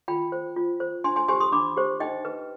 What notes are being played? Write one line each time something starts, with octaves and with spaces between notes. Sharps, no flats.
F4 G5 B5
C5
F4
C5
D4 G#5 C6
G#5 C6
G4 C5 G#5 C6
C6 D#6
D4 B5 D6
G4 C5
D#4 D#5 G5
B4